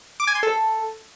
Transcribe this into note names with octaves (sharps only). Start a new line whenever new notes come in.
D6
G#5
C6
A4